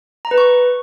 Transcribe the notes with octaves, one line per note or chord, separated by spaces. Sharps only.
A#5
B4
C#6